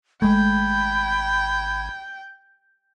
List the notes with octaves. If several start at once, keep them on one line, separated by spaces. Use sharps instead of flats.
G#1 G#3 A3 G5 B5 G6 G#6